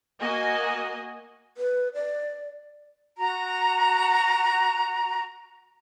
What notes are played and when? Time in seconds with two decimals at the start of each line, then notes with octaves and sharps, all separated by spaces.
0.20 A#3 F#4 D#5 G#5
1.57 B4
1.94 D5
3.18 F#4 A#5